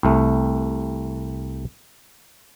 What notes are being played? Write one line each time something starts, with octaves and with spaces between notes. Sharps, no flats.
C2 A3